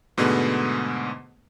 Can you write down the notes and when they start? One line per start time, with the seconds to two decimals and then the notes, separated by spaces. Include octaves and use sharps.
0.18 G#2 B2 D3 G#3 A3 B3